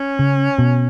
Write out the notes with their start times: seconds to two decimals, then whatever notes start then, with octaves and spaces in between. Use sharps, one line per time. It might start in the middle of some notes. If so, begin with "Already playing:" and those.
Already playing: C#4
0.19 C#3
0.59 B2